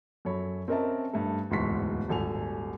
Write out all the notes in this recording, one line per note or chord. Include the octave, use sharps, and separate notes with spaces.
F#2 A4 C#5 B5
C4 C#4 A#4 D#5 E5 A5
G2 A3
D1 E2 G#2 C6 C#6 B6
D#1 G#1 A4 G#5 F7